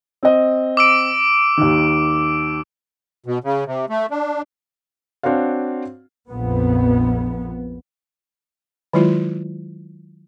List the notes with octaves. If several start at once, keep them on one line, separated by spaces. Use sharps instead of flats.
C4 D#5
D6 E6 D7
D#2 D#3
B2
C#3
C3
A3
D4
C4 D4 F#4 C#5 F5
A#1 F2 B3
D#3 F#3 G#3 E4 F4